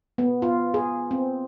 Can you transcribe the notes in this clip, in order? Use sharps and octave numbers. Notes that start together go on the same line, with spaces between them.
B3
F4
G#4
C4